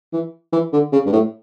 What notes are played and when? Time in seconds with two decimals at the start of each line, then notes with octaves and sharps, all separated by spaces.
0.13 E3
0.53 E3
0.73 D3
0.93 C#3
1.06 G2
1.13 A2